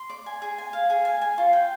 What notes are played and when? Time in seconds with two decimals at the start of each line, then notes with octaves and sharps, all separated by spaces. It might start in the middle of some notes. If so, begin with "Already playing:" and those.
Already playing: C6
0.10 D5
0.26 G#5
0.42 G#4
0.58 G#5
0.73 F5
0.90 G#4
1.05 G#5
1.21 G#5
1.38 F4
1.53 G5